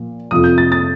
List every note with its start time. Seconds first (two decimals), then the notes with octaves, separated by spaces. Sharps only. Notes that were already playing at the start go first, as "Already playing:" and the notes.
Already playing: A#2 F3
0.31 F2 C3 F3 D#6
0.44 G6
0.58 A6
0.72 A6